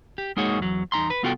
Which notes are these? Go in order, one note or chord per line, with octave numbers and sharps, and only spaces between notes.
G4
G#3 A#3 D#4 F#4 G#4 C#5
E2 F#3
E2 D#4 A#5 C6
B4
C2 B3 F4 F#4 A4 G5